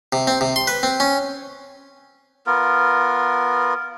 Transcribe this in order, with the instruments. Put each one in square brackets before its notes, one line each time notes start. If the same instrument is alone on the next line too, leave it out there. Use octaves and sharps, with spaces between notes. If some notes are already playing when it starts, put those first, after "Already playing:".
[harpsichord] C3
C4
C3
C6
B4
C4
C#4
[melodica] B3 F4 A#4